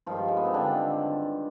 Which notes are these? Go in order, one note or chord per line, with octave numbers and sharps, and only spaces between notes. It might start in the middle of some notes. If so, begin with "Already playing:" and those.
G2 D#3 F3 G#3 F4
G#3
B3
C4
D3 D4